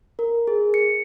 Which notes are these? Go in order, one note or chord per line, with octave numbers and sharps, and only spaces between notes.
A#4
G#4
C#7